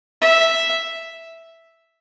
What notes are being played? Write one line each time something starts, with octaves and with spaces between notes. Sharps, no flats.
E5